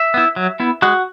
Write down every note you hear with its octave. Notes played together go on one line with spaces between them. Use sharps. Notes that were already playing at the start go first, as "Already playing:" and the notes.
Already playing: E5
B3 E4
F#3
B3 E4
G#3 F#4 F#5